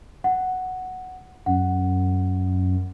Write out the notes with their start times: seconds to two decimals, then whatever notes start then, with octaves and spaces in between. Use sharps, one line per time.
0.24 F#5
1.46 F#2 F#5